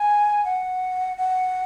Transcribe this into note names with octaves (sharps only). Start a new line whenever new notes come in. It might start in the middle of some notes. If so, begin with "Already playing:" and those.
Already playing: G#5
F#5
F#5